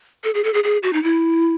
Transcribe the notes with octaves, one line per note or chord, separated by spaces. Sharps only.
A4
G#4
A4
G#4
G#4
F#4
D#4
E4